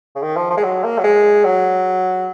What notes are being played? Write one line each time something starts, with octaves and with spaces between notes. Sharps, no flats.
C#3
D#3
F3
F3
G#3
F#3
A#3
F#3
G#3
F#3